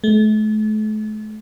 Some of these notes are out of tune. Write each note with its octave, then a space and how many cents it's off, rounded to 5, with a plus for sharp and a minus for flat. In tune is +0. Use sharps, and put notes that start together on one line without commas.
A3 -40